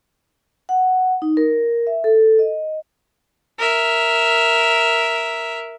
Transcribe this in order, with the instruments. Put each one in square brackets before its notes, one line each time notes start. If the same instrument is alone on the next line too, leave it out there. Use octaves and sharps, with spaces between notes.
[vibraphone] F#5
D#4
A#4
E5
A4
D#5
[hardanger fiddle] A#4 E5